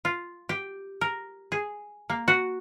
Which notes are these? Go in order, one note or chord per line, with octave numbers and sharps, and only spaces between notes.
F4
G4
A#4
G#4
A#3
F#4